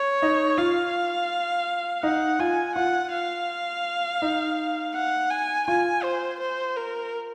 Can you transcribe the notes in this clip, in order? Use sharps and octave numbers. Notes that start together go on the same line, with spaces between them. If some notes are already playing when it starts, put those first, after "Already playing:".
Already playing: C#5
D#4
F4 F5
D#4 F#5
F4 G#5
F4 F#5
F5
D#4
F#5
G#5
F4 G#5
C5
C5
A#4